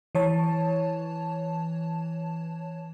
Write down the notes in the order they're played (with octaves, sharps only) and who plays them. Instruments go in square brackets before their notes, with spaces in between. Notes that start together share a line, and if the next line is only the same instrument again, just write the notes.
[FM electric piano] E3 C#5 A5